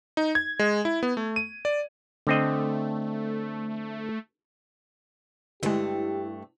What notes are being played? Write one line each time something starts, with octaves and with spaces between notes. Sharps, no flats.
D#4
G#6
G#3
E4
B3
A3
D#7
D5
D3 A3 C4 D#5
G2 D3 G#3 A3 E4 G4